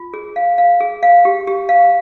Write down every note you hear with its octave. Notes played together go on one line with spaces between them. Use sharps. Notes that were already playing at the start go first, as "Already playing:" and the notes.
Already playing: F4
G#4
F5
F5
G#4
F5
G4
G4
F5